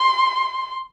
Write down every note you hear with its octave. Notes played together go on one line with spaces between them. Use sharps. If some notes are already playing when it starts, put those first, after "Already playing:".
Already playing: C6